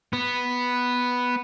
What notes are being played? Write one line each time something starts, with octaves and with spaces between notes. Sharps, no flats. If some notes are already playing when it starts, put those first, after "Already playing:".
B3